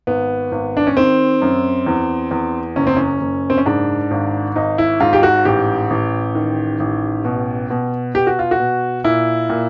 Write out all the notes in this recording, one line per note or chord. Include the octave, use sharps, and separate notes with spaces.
G#1 B3
G#1
D4
C#4
D#3 C4
F#2
E2
E2
F#1 C#4
C4
C#4
F#1
C4
C#4
G#2 D4
G#1
G#1 D#4
E4
G#2 F4
G4
F#4
A1 G4
A1
D#3
A1
B2
B2
B2 G4
F#4
F4
F#4
B2
A#2 E4
A#2